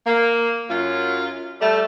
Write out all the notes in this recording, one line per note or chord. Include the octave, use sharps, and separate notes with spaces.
A#3
F#2 F4
G3 A3